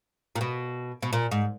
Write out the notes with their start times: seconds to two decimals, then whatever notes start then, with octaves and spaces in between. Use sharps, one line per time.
0.36 A#2
0.41 B2
1.02 B2
1.13 A#2
1.31 G#2